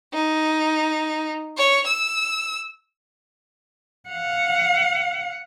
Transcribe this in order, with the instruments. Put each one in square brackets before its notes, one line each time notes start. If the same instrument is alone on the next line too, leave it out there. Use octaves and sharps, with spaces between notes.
[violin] D#4
C#5
E6
[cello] F5 F#5